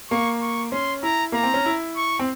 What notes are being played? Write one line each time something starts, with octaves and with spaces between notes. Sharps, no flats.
A#3 C#6
C#6
C#4 C6
E4 A#5
A#3 A#5
C4
C#4
E4
C#6
C4